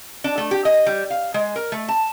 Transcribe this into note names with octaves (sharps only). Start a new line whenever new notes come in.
D4
A3
G4
D#5
G3
F5
G#3
A#4
A3
A5